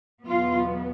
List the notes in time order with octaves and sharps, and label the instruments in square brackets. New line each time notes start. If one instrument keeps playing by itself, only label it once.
[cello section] E2 B2 F#3 B3 F4